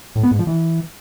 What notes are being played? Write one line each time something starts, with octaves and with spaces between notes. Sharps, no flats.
A2
B3
G#2
F3
E3